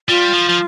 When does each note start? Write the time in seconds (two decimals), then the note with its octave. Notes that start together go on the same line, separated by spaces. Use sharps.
0.09 G3 F4
0.33 F3
0.49 F3